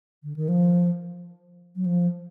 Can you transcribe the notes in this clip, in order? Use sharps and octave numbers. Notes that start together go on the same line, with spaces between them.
D3
D#3
F3
F#3
F3